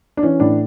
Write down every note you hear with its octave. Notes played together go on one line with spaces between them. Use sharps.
D4
E3 C#4
A2 D4